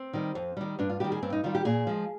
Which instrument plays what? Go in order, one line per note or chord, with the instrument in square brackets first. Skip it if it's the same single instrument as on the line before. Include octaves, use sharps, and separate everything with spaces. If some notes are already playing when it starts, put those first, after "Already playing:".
Already playing: [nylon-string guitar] C4
D#3 G3
F2
D#3 G3
G2 D4
F4
D#3 G3 G4
G#4
G2 C4
D#4
D#3 G3 F4
G4
A#2 G#4
F3 G#3